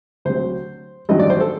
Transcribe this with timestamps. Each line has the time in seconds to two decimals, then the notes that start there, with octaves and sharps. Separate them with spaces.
0.25 D2 C3 F#3 C5
1.09 A1 G2 D#3 F#3 D#5
1.20 D5
1.30 C5
1.40 A4